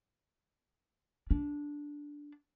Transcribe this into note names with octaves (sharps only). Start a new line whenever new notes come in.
D4